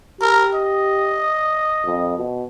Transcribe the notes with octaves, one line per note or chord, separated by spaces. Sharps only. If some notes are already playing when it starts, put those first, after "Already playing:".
G4 A#4
D#5
F2
B2